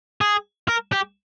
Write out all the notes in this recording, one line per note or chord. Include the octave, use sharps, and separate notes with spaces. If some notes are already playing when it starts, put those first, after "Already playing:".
G#4
A#4
G4